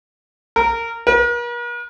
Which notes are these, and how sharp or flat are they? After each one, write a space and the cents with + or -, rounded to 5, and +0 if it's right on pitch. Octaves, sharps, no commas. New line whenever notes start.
A#4 -20
A#4 +45